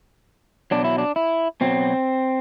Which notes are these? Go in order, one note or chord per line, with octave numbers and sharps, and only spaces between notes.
B2 F#3 D4
E4
D4
E4
B2 F#3 C4